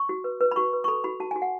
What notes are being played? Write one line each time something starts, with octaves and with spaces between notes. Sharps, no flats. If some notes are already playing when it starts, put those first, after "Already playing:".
Already playing: C#6
F#4
B4
B4
B5
F#4 C#6
B4
C#6
A4 B5
F#4 B5
F#4 A5
F#4 G#5
F#5